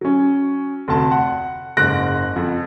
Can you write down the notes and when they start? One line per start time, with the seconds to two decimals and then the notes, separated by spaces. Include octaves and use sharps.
0.01 F#3 C#4
0.88 F1 D2 A5
1.11 F#5
1.77 F#1 G#2 F#6 A#6 D7
2.36 F2